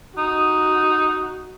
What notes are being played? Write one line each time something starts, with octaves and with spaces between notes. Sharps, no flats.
D#4 F#4